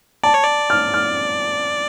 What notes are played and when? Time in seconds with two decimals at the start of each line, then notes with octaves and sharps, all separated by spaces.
0.24 D5 A5
0.34 C#5
0.44 D5
0.70 F6
0.94 F6